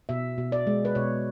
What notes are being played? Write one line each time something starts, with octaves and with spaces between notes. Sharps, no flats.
B2 E5
B2
D5
G#3
B4
B2 C#5